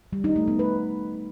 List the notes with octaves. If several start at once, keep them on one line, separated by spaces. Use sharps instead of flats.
G3
D#4
A3
B3
B4